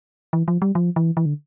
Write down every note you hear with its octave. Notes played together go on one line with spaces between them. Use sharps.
E3
F3
G3
F3
E3
E3
D3